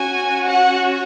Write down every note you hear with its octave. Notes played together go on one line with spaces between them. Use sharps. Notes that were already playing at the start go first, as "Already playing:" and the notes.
Already playing: C#4 F#4 G#5
F#5